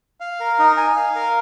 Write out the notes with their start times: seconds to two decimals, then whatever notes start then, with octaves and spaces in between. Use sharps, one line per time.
0.20 F5
0.40 A#4
0.59 D#4
0.77 G#5
0.96 F5
1.15 A#4